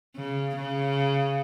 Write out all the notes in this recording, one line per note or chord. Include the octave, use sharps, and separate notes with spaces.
C#3
C#3